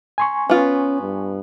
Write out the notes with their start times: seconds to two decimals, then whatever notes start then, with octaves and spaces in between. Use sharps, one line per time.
0.18 G#5 C6 C#6
0.49 B3 C#4 F4
1.01 G2